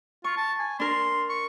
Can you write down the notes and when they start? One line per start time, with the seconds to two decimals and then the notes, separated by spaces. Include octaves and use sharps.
0.24 F4 C#6
0.37 A5
0.59 G#5
0.80 D4 A#4 C6
1.29 C#6